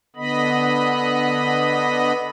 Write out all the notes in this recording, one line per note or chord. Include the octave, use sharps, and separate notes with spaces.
D3 B3 D#5 B5